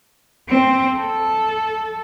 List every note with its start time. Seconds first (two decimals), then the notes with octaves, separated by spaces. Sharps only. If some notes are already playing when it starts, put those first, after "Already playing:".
0.49 C4
0.97 A4